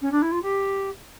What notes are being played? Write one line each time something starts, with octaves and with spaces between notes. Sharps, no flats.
C#4
D4
E4
F4
G4